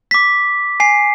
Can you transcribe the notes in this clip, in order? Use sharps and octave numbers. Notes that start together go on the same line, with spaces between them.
D6 B6
G#5 C7